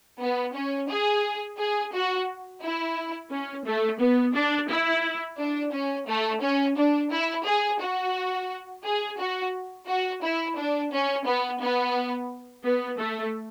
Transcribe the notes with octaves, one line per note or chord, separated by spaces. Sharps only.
B3
C#4
G#4
G#4
F#4
E4
C#4
A3
B3
D4
E4
D4
C#4
A3
C#4
D4
E4
G#4
F#4
G#4
F#4
F#4
E4
D4
C#4
B3
B3
B3
A3